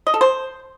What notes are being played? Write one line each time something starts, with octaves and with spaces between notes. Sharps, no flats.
D#5
A4
C5